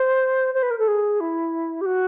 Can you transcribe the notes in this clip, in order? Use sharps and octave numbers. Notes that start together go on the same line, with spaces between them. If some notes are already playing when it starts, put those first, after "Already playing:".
Already playing: C5
C5
B4
A#4
A4
G#4
E4
G4
F#4